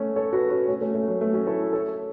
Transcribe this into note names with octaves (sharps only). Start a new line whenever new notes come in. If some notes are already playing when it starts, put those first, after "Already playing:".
Already playing: A3 C#4
A4 C#5
F#4 B4
C#4 F#4
A3 C#4
A3 C#4
A3
F#3
A3
C#4 F#4
E4 A4
A4 C#5